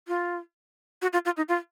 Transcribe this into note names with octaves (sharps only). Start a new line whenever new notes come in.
F4
F#4
F4
F4
D#4
F4